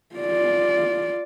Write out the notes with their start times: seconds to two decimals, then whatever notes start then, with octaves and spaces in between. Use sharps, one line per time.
0.16 F4 D5